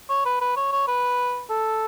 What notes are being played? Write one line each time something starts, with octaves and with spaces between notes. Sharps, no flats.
C#5
B4
B4
C#5
C#5
B4
A4